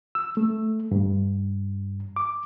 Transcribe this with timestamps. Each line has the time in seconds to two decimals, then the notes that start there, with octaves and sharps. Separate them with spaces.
0.15 E6
0.37 A3
0.91 G2
2.16 D6